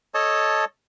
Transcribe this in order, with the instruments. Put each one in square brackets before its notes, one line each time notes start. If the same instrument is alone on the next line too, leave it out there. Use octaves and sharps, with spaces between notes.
[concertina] A4 C#5 D#5 A5